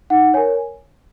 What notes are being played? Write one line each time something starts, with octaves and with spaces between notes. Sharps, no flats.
D#4 F#5
A#4 C#5 G#5